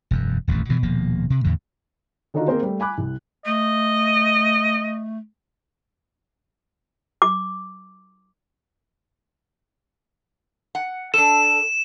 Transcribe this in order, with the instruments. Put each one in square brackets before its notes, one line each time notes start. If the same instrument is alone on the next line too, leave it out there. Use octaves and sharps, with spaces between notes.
[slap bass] E1 F#2
D#1 A1 F2 A3
G2 B2 E3
D#1 B2 F3 A#3
C3
E2 A2 D3
[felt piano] D3 D#3 D4 D#4 F4 F#4
A#3 C4 G#4 A#4 C5
G3 A3
G#5 B5 D6 F#6
C2
[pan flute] A3 [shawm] D#5
[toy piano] D6
[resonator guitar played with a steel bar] F#5
[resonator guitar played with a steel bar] D4 A4 [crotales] E7